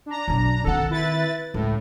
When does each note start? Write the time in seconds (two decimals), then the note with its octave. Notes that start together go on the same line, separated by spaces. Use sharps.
0.06 D4 A#5
0.28 B1 F#2
0.64 D#3 C4 A4 F#5
0.90 E4 B4 A6
1.54 C#2 A2